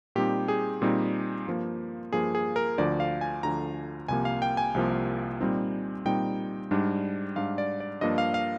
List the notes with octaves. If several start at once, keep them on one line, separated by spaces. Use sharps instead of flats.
A#2 G3 C4 D#4 G4
G#4
A#2 G3 C4 D#4
G2 F3 A#3
G2 F3 A#3 G#4
G#4
A#4
D2 D3 F3 D5
F5
G#5
D2 D3 F3 A#5
C2 C3 F3 A#3 G#5
F5
G5
G#5
C2 C3 F3 A#3
A#2 G3 C4 D#4
A#2 G3 C4 D#4 G5
G#2 G3 D4
G#2 G3 D4 F5
D5
D5
G2 F3 A#3 D4 D#5
F5
F5